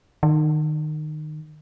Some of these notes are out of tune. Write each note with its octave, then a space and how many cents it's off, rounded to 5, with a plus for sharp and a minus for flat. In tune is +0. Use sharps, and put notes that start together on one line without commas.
D#3 -25